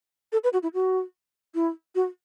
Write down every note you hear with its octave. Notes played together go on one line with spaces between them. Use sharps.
A4
B4
F#4
E4
F#4
E4
F#4